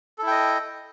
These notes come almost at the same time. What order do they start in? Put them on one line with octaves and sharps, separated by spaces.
A4 E4 G5 D#5